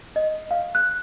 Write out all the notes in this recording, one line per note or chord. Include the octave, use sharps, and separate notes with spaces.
D#5
F5
F#6